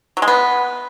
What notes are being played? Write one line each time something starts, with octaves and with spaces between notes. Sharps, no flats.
F#3
G#3
B3